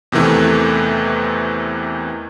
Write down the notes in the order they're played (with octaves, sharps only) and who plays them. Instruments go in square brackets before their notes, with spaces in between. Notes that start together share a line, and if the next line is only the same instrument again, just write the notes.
[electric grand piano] E2 C3 D#3 E3 A3